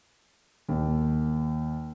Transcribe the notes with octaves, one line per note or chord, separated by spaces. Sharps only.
D#2